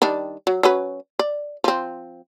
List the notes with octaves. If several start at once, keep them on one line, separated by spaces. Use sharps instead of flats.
D#3 G3 D4
F#3
F#3 C#4 B4
D5
F3 C4